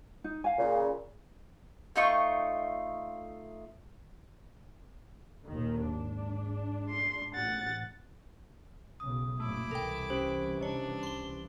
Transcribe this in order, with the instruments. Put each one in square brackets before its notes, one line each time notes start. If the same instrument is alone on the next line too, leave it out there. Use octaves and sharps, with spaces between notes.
[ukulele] D#4
F5 G#5
[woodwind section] A#2 C#3
[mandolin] A3 D#4 F4 C#6
[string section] D#2 A#2 D#3
G#2 D4
[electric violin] C6
[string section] A1 [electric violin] F#5 A6
[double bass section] B1 C#3 [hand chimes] D#6
[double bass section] F#1 A#2 [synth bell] A3 [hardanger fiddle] E4 D6
[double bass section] C2 E3 [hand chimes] A4 [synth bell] A#4 G5
[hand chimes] C#4 G4 C5
[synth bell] D#3 C#5 [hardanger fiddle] D4
[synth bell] C6 G7